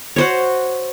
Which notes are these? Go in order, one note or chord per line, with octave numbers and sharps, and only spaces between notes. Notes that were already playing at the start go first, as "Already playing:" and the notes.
F#4 C5 C#5